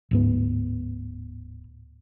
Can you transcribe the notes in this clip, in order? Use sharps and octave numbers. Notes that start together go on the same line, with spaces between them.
D1 G#2 B3